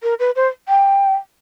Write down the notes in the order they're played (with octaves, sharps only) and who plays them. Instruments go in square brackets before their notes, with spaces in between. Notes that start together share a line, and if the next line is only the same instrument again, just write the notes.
[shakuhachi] A#4
B4
C5
G5